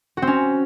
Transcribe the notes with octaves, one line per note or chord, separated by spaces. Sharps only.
F#4
C4
C#4